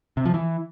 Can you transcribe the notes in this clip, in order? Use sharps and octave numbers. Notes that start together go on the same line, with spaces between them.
C3
F3
E3